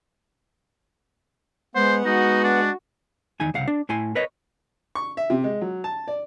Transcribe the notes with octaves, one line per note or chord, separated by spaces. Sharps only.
G#3 B3 C5 F#5
G#3 D#4 F#4
D4
E2 D#3 D#4 G#5
C2 C#3 F5 F#5
D4
A2 E4 G#5 C6
A#4 B4 C#5 D#5
C#6
E5
C3
G#3
F#3
A5
D5